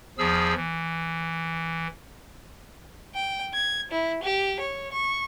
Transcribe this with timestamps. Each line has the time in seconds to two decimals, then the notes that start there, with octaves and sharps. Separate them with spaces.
0.18 E2 F3 G#4 E6
0.55 E3
3.15 G5
3.54 G#6
3.92 E4
4.23 G4
4.60 C#5
4.93 C#6